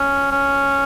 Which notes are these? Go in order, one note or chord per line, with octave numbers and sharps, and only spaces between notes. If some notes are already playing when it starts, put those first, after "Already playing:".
Already playing: C#4
C#4